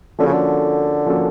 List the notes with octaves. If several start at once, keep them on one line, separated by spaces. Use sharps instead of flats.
D3 F3 A#3 C#4 F#4 A4
C#3
D3
F3 A#3 C#4 F#4 A4